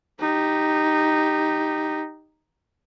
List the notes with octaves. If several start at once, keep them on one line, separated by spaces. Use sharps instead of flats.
D#4 G4